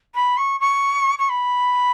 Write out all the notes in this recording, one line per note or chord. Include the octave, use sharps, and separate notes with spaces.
B5
C#6
C#6
C#6
B5